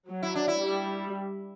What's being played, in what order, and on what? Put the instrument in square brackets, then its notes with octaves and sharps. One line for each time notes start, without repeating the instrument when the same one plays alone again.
[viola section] F#3
[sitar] E4
D4
E4
[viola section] G3